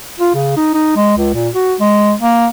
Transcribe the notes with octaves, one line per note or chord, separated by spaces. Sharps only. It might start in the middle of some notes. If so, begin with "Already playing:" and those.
F4
C#3
D#4
D#4
G#3
C#2
A#2
F#4
G#3
A#3